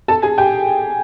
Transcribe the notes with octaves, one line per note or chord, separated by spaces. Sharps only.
A4 A5
G#4 G#5
G4 G5